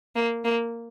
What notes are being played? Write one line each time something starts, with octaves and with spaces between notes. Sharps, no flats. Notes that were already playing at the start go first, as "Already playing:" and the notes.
A#3
A#3